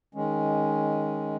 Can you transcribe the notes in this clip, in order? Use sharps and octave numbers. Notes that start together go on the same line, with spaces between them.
D#3 G#3 C#4